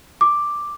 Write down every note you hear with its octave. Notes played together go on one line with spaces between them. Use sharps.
D6